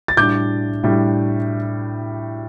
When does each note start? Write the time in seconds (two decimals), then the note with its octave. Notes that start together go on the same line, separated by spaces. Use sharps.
0.08 A6
0.17 A2 G3 D4 D6 G6
0.83 A2 G3 D4